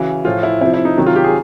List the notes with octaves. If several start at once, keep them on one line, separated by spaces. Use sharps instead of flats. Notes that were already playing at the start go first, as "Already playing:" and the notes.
Already playing: C#3 E3 F#4
A2 F3 F4
E4
C3 F3 E4
E4
D#4
C3 D#3 F#3
F4
G4
G#4